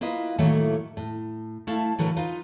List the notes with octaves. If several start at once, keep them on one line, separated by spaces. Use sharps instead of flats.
A#3 E4 F4 B4 D#5
A2 D#3 F#3 A3 A#3 E4
A2
A3 E4 F5 A5
A2 D3 E3 F#3 A#4 B4
D#4 F4 B4